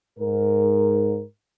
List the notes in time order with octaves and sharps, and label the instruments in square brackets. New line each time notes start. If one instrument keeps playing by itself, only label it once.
[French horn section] G#2 A#4